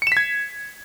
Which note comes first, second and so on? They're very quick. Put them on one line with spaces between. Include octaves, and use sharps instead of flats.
C#7 E7 B6 G#6